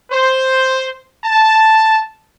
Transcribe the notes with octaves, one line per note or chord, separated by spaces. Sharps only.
C5
A5